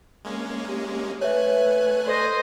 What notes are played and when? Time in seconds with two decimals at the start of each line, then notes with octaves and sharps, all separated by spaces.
0.25 G#3 A#3 C#4
0.68 G4
1.21 A3 B4 C#5 E5 G#5 F#6
2.07 A4 B4 C5 D5 D#5